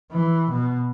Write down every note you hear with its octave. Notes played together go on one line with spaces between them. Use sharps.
E3
B2